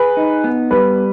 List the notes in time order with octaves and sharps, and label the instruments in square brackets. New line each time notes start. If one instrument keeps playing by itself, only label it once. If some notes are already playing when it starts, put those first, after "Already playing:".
Already playing: [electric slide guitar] G#4 [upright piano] B4
[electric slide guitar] D#4
B3
[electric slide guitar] G3 [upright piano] B4